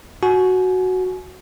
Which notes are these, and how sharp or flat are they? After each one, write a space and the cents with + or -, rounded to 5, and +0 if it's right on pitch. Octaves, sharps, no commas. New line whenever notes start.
F#4 +0 G#5 +35